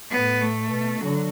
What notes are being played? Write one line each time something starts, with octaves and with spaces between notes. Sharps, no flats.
A2 B3
A3
B2
D3 F#3